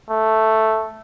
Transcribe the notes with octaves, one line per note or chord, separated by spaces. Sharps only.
A3